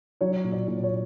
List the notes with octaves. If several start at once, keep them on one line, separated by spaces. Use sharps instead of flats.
F#3 C#5
A#2
D5
A#2
C#5